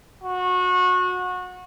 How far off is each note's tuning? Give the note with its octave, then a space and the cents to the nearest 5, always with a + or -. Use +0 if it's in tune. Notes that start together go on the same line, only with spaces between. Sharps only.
F#4 -25